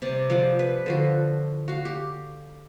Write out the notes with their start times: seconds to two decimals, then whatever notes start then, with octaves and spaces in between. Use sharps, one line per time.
0.02 C3 G3 D5
0.30 F3 G3 F#5 D6
0.59 B4
0.86 D3 F3 F#4
1.68 F#4 F5
1.85 G4